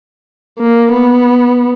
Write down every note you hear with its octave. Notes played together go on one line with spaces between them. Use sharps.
A#3
B3